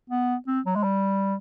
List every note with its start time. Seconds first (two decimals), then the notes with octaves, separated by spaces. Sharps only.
0.10 B3
0.47 C4
0.66 F#3
0.76 G#3
0.83 G3